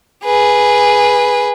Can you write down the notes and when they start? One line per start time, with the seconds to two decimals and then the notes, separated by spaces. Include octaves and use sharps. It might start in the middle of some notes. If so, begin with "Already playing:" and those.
0.24 G#4 B4